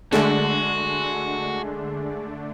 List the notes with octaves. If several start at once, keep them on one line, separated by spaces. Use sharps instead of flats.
D3 G#3 A3 D4 F#4